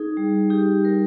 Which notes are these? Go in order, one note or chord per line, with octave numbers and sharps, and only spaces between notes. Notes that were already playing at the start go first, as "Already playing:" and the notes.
Already playing: D#4 G#4
G3
D#4 G4
G3 A#4